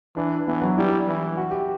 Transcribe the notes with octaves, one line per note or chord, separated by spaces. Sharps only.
E3 D4
E3 B3
F#3
G3 E4
E3
F#4
G4